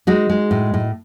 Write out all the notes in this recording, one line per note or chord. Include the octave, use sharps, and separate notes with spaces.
G#3 D#4 F#4
G#3
A2
A2